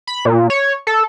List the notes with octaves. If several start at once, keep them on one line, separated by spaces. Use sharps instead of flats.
B5
A#2
C#5
A4